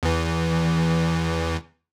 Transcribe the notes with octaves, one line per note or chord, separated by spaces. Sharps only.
E2 E3